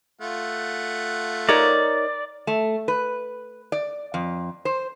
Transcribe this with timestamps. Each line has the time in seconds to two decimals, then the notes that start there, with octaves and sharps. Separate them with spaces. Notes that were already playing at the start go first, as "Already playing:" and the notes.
0.21 A3 F4 F#5
1.49 D#4 A#4 C#5 D5
2.47 A3
2.88 B4
3.72 D5
4.14 F2
4.65 C5